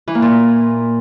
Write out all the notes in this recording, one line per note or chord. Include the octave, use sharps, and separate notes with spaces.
E3
A#3
A#2